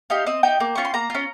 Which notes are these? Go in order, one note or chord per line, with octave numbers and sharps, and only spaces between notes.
D#4 G4 F5
C4 D#5
D#4 G4 G5
A#3
C#4 F4 C#6
C6
A#3 A#5
C#4 F4